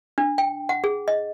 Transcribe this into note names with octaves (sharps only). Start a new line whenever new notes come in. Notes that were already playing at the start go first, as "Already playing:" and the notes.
D4
G5
F#5
G#4
D#5